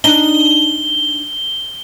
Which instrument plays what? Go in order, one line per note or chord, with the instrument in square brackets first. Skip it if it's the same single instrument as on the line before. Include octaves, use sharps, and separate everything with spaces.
[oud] D4 D#4 [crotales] G7